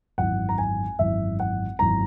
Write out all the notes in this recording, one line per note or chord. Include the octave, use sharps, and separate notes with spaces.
G#1 F#2 E3 F#5
A#5
G#5
G#1 F#2 E3 E5
F#5
G#1 F#2 E3 A#5